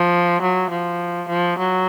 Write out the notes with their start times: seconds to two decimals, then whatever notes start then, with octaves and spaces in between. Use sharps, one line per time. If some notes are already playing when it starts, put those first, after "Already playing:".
Already playing: F3
0.42 F#3
0.71 F3
1.29 F3
1.58 F#3